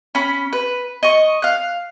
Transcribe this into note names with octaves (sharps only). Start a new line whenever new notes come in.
C#4 B5
B4
D#5 C#6
F5 F#6